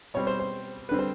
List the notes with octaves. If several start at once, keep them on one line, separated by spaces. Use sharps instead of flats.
B2 G3 C4 C#5
C5
C5
D3 G3 C4 B4
C5